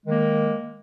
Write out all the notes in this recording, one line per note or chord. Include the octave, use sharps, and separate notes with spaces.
D#3 G#3 A#3